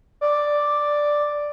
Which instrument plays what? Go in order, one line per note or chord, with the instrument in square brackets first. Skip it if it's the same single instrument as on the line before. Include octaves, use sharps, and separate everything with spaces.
[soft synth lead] D5